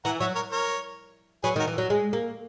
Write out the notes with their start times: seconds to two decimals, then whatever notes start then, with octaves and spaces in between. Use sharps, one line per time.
0.05 E3 F#5 A#5
0.20 F#3 C#5 E5
0.35 A#4 C#5
0.51 A#4 C#5
1.44 F#3 G#4 B4
1.56 D#3
1.59 F#4 A#4
1.67 E3
1.78 F#3
1.90 G#3
2.13 A#3